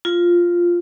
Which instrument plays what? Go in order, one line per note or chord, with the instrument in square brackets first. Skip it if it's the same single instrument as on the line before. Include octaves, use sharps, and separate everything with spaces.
[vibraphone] F4